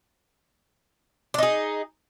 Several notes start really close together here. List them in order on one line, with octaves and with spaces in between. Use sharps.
D4 D#4 G#4